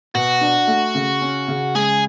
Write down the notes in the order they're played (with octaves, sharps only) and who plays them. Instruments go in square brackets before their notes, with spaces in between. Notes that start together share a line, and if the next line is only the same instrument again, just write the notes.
[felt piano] B2 [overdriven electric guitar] F#4
[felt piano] D4
A3
C#3
C#4
C#3
[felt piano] G#3 [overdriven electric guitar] G#4